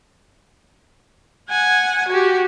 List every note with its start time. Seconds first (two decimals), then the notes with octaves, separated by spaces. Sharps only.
1.49 F#5 G#5
2.08 F#4 G4